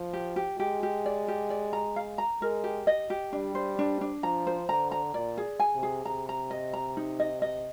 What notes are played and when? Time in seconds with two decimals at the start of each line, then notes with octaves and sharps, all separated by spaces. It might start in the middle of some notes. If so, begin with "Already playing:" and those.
Already playing: F3
0.13 G4
0.36 G4
0.59 G#3 G4
0.83 G4
1.06 D5
1.28 G4
1.50 D5
1.73 A#5
1.96 F5
2.18 A#5
2.42 G#3 A#4
2.64 G4
2.87 D#5
3.10 G4
3.33 G3 D4
3.55 C5
3.79 D4
4.01 D4
4.23 F3 A#5
4.47 C5
4.69 D3 A#5
4.92 A#5
5.14 A#2 D5
5.37 G#4
5.60 G#5
5.75 C3
5.83 G#4
6.05 C3 A#5
6.29 A#5
6.51 D#5
6.73 A#5
6.97 D#4
7.20 D#5
7.42 D#5